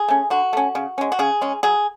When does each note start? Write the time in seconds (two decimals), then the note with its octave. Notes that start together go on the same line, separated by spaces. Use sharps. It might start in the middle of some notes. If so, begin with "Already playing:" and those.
Already playing: G#4
0.08 A3 C#4
0.30 D3 F#4
0.53 A3 C#4
0.75 C#3
0.98 G#3 C#4
1.12 F#4
1.19 C#3 G#4
1.41 G#3 C#4
1.63 F#3 G#4